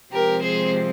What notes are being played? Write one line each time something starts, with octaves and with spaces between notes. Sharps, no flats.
C3 F3 G#3 C4 G4 A#4
G#4 C5